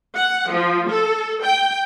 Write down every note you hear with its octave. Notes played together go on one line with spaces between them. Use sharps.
F#5
F3
A4
G5